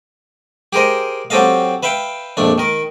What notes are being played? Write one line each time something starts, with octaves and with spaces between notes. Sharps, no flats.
G4 G#4 A#4 C5 D#5
F#3 C4 G4 A4 D#5 F5
B4 E5 F5 G5
A#1 F2 A3 D4
D#3 A#4